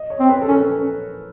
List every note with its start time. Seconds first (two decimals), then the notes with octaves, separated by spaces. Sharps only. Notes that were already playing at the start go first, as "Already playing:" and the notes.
Already playing: D#5
0.10 C#5
0.20 C4
0.29 B4
0.41 A4
0.48 C#4 A#4